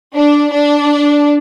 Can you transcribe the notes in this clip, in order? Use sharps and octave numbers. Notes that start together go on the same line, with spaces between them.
D4
D4